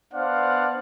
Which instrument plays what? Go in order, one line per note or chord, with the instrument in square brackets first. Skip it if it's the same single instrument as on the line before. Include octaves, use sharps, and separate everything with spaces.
[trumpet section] B3 D4 C5 D5 F5 F#5